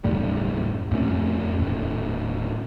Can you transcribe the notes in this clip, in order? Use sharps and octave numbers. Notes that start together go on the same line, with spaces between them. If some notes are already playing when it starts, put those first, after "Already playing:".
F#1 D#2 A2 G3
F2 A#2 A3 C#4
D#1 A2